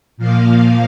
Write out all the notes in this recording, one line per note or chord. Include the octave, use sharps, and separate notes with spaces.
A#2 F3 A#3 F5